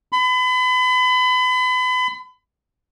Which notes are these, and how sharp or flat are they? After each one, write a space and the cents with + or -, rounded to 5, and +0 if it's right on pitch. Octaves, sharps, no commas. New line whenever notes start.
B5 +35